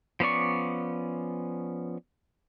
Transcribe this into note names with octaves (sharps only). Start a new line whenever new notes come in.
F3 B3 C#4 D5 C#6